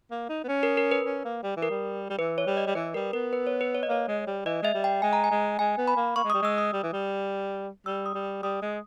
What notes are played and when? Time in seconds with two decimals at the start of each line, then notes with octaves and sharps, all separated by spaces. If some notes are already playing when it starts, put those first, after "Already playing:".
0.11 A#3
0.29 D#4
0.44 B3
0.48 C#4
0.63 A#4
0.77 A#4
0.91 B4
1.06 C#4
1.25 A#3
1.43 G3
1.57 E3
1.63 A#4
1.70 G3
2.10 G3
2.19 E3 B4
2.38 C#5
2.47 G3
2.57 D#5
2.67 G3
2.75 E3 B4
2.94 G3 A#4
3.13 B3 A#4
3.33 B4
3.47 C#5
3.61 B4
3.75 C#5
3.83 D#5
3.89 A#3 C#5
4.08 G#3
4.27 G3
4.45 E3 D#5
4.62 G#3 E5
4.74 G3
4.84 G5
5.02 G#3 G#5
5.13 A#5
5.24 G#5
5.31 G#3
5.59 G#3 G#5
5.78 B3
5.88 B5
5.96 A#3
6.16 A#3 C#6
6.24 G#3
6.30 D#6
6.34 G3
6.42 G#3 E6
6.58 D#6
6.73 G3
6.83 E3
6.93 G3
7.86 G3 E6
8.06 D#6
8.15 G3
8.43 G3 D#6
8.62 G#3